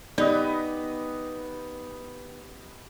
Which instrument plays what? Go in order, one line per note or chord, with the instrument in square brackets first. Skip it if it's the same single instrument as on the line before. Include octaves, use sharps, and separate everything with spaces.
[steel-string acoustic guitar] B3 [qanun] D#4 [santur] G4 B4 D#5 [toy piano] D5